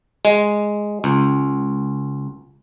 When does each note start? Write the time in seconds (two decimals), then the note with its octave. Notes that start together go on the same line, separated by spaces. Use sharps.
0.25 G#3
1.04 C#2